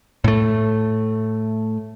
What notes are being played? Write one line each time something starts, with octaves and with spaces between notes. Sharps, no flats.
A2 A3